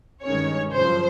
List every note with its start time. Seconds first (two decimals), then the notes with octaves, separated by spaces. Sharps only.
0.23 G2 D#3 G#3 C#4 C#5
0.72 F#2 C#3 F3 C5